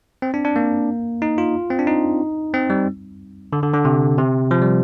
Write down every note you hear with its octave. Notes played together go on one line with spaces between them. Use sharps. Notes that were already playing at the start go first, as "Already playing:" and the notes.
C4
D4
D4
A#3
D#4
F4
C4
D4
D#4
C4
G3
D3
D3
D3
C3
C3
F3
G3